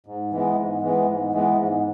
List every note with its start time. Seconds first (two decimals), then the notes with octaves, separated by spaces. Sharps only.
0.06 G#2
0.32 E3 G#3 B3
0.57 G#2
0.82 E3 G#3 B3
1.06 G#2
1.32 E3 G#3 B3
1.57 G#2